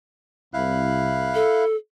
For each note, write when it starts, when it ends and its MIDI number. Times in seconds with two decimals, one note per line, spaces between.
0.54 1.41 36
0.54 1.65 64
0.54 1.64 77
0.54 1.64 90
1.34 1.76 69